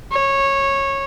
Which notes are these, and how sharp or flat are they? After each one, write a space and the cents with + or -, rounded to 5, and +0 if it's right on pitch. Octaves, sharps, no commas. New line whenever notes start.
C#5 -15